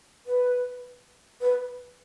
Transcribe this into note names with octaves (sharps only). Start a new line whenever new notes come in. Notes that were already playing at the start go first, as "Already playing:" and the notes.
B4
B4